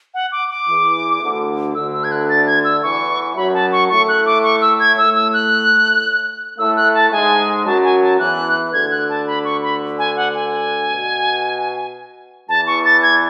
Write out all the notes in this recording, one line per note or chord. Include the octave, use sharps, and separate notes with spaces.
F#5
D6
D6
E2 E3
D2 D3
D2 D3 E6
E6
G#6
F#6
A6
G#6
E6
E2 E3 C#6
F#2 F#3 B5
A5
C#6
A2 A3 C#6
F#6
D6
C#6
E6
G#6
A2 A3 E6
E6
F#6
A2 A3 E6
F#6
A5
G#2 G#3 G#5
F#2 F#3 A5
G#5
A5
E2 E3 F#6
D2 D3 G#6
F#6
A5
B5
C#6
B5
G#5
F#5
G#5
B2
E2 E3 A5
C#6
A6
G#6